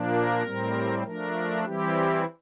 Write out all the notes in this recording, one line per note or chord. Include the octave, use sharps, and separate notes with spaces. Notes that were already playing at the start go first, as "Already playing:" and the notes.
Already playing: A#2 F3 A#3 D4
A#4
A2 G3 C4
F3 A3 D4 A#4
E3 G3 C4 E4 G4